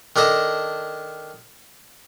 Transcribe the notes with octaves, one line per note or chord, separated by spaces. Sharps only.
D#3 D4 A4 D#5